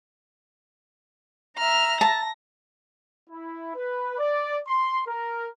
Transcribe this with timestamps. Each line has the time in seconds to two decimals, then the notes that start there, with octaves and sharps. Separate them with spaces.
1.58 E5 A#5 F6 F7
2.01 A5 A#6
3.30 E4
3.75 B4
4.18 D5
4.67 C6
5.07 A#4